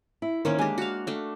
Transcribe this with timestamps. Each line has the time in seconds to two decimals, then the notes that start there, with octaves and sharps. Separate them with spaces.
0.22 E4
0.45 D#3 A#3 C#4 A#4 C5 C#5
0.59 G#3 D4 G4 G#5
0.78 F#4 F5
1.07 A3 D4